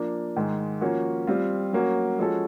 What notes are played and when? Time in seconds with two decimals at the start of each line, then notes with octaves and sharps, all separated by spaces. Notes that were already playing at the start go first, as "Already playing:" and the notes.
Already playing: F3 A#3 D4
0.36 G#2 D#3 G#3
0.81 F3 A#3 C#4 F#4
1.27 G3 C4 F4
1.73 F#3 A#3 C#4 F#4
2.19 F3 G#3 C#4 F#4 A4